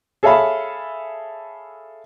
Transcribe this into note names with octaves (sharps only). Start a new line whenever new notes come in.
G#4 A4 C#5 E5 F5 B5